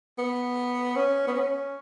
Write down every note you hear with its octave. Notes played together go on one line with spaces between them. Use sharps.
B3
C#4
B3
C#4